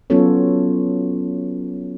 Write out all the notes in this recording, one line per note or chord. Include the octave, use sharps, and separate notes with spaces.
F#3 B3 C#4 F4 A4 C#5